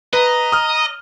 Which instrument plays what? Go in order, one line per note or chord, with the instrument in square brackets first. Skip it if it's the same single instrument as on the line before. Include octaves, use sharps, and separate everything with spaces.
[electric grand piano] B4 [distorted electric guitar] D#5 [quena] A#5
[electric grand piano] D#6 F6